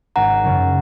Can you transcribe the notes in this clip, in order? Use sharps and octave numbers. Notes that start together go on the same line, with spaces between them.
G#1 F#5 A#5
F#2 C#3 F#3